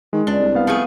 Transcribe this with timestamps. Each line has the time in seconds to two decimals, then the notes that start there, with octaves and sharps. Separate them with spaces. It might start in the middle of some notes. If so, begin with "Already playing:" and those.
0.13 D#3 G#3
0.27 C#2 D4
0.39 C2
0.55 B3 F5
0.67 F3 A3 G#4